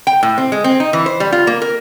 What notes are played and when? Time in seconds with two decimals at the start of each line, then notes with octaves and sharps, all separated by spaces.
0.07 G5
0.23 A2
0.38 C4
0.52 G#3
0.64 C4
0.80 D#4
0.93 E3
1.06 C5
1.20 G3
1.32 F4
1.47 A#3
1.62 A#4